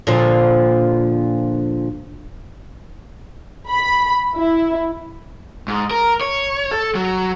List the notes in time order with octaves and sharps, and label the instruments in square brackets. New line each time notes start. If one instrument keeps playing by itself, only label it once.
[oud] A#2 D3 F3
[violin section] B5
E4
[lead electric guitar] G#2
A#4
C#5
A4
F#3